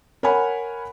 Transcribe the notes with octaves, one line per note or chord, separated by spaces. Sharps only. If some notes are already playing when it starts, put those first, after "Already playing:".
A#4 C#5 F#5 G#5 B5